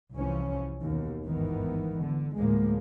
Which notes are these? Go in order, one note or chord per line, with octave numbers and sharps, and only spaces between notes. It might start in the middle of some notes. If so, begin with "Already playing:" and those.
C2 E3 F3 C#4
D#2 B2
G#1 G2 D#3 E3 B3
D3
D2 A2 F3 G#3 A#3